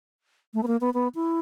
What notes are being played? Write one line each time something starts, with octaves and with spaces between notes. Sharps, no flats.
A3
B3
A#3
B3
B3
E4